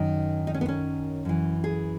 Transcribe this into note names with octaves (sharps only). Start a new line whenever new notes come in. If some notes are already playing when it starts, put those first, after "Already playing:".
Already playing: F#2 D#3 D#4
D#4
C#4
B3
C#4
F#2 E3
G#4